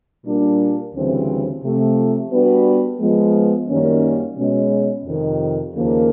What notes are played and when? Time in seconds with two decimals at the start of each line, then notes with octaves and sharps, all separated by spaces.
0.25 A#2 G3 A#3 D4
0.94 D2 C#3 E3 G3 C4
1.62 C3 F3 A3
2.31 G3 B3 D4 F#4 B4
3.00 F3 G#3 B3
3.68 F#2 D#3 G3 A#3 C#4
4.37 B2 G#3 C#4
5.05 F2 C3 D#3
5.74 D#2 C#3 F3 A#3